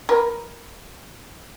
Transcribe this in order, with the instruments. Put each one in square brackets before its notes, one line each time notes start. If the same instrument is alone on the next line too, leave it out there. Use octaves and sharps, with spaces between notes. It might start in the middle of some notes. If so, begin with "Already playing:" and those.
[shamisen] A#4 B4